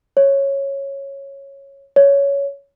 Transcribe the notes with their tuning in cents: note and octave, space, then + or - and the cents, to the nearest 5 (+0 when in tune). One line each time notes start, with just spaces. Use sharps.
C#5 -10
C#5 +15